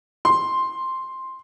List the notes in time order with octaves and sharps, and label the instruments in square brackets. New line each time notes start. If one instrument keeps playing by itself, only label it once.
[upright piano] C6